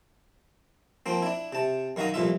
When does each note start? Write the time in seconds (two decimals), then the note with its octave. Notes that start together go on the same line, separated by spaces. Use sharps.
1.06 F3 A#3 C4
1.22 D4 E4
1.53 C3 A5
1.96 F#2 D#3 F#4 F5 A#5 D#6
2.14 C2 F2 A#2 F4 E5